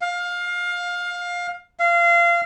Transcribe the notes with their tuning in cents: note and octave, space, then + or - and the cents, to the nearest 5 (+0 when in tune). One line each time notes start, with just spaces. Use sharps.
F5 +20
F5 -25